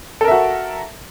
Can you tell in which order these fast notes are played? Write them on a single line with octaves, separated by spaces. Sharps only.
A4 A#4 E5 F#4